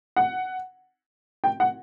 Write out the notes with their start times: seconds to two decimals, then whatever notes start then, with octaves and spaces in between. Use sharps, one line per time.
0.16 F#5
1.44 G5
1.60 F#5